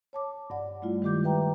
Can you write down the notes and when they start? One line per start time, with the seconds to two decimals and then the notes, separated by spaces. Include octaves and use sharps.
0.13 C#5 A5 D6
0.50 G2 D5 F#5
0.82 G3 A3 E4 F4
1.02 D#3 G#3 G4 D6 G6
1.24 B4 E5 G5 A#5